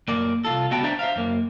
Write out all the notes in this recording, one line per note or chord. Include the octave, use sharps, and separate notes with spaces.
F#2 A#3 D5
C2 F4 A4
C#2 G3 B3 F#4 G5 A5
D4 B4 C5 D5 E5 A#5
C5 E5 F5
F#2 A#3